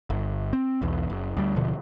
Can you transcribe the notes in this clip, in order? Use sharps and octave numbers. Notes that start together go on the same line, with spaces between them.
G1
C4
B1 E2
F#1
D2 G3
D#1 B2 D3 F3